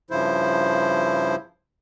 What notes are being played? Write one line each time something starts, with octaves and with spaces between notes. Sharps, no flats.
G2 C#3 F3 E4 C5